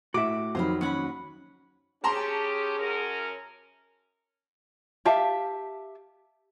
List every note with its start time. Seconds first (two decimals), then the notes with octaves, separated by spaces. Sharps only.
0.14 A2 F#4 E5 D6 D7
0.55 F2 D#3 F#3 C5 F5 B5
0.81 D#2 C#4 F#4 F#5 B5
2.04 C#4 G4 G#4 A5 A#5 C6
2.79 F#2 C#4 A#4
5.05 G4 E5 F5 A5